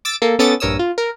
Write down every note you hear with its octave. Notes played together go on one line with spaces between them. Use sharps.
D6 E6 A6 D7
A#3 A4
B3 C#4 A4 D6 D#6 A6
A#1 G2 A#4 C#5 D#6 E6
F4
A#4